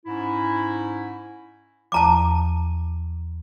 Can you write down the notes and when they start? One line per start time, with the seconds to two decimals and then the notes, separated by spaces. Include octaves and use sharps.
0.06 G#2 C#4 E4
1.92 E2 F3 A5 A#5 D6